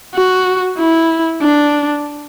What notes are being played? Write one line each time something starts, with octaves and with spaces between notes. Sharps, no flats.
F#4
E4
D4